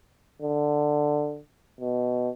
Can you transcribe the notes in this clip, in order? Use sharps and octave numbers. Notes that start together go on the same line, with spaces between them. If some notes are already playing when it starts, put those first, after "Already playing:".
D3
B2